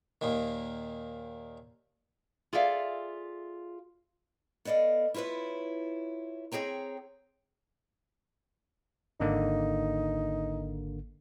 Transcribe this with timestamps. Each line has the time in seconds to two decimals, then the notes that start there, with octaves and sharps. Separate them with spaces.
0.21 D#2 A#2 D#3
2.53 F4 G#4 A4 D5 E5 F5
4.65 B3 A4 D5 D#5 F5
5.14 E4 F4 A4 B4 C#5
6.52 C4 G#4 C#5 G5 A#5
9.20 G#1 D3 A#3 D#4